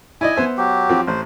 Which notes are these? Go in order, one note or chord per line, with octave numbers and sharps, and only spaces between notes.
E4 D5 D#5 G#5
B3 C5 E5
F#3 G4
F3 C4
A1 C5